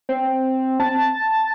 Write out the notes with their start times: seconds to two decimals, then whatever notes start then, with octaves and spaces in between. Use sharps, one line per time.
0.09 C4
0.80 A5